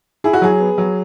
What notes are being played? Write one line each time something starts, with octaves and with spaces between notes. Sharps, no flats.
E4 G#4
F#4
F#3 G#4
B3
F#3